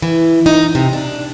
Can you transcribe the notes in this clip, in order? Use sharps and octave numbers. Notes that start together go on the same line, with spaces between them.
E3
D#4
C3
D4